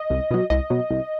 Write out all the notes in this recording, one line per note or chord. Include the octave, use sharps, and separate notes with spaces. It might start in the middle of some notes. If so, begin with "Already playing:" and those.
Already playing: D#5
C2
B2 F#3
C2 D#5
B2 F#3
C2